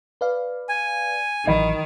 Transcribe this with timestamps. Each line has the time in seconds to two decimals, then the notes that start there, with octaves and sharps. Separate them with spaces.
0.21 B4 D5 F5
0.69 G#5
1.47 A1 D#3 E3 F#3 D#5 B5